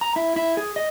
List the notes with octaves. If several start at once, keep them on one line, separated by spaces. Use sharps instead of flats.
A#5
E4
E4
G#4
D#5